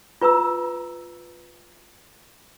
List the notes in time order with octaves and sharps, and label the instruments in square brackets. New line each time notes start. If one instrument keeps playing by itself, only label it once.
[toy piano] F4 B4 A#5 E6